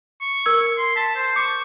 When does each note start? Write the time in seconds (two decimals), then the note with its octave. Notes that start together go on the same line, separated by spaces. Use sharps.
0.21 C#6
0.46 A#4 E6 G#6
0.77 C6
0.96 A5 B6
1.15 C5
1.36 C#6 D6